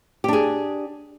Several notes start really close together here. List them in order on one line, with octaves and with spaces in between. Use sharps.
G4 D4 G#4